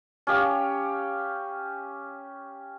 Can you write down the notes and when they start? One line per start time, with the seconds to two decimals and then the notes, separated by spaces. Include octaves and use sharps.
0.27 C#4 G4 F5